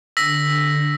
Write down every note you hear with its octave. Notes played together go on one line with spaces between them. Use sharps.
D3 E6 A#6 B6